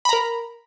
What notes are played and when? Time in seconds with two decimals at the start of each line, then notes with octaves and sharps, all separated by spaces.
0.05 B5
0.09 A#5
0.13 A#4